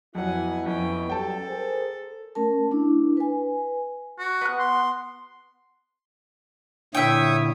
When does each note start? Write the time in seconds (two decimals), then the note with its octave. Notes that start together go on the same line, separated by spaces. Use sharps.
0.15 F2 F#3 B3 E4 B4 F#5 G#5
0.66 F2 C#4 G5
1.10 F#3 G3 C#4 A4 G5 A5
1.48 G#4 A#4 C5
2.35 A3 C#4 A#4 A5
2.71 D4 E4
3.17 B4 G#5
4.18 F#4
4.41 B3 F#6
4.59 C6
6.95 A#2 D3 E4 C#5 E5 G5 D#6